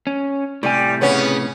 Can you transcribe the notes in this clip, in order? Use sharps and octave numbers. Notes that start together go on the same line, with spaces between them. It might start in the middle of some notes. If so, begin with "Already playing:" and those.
C#4
A2 C3 G3 G#5
C#3 B3 C#4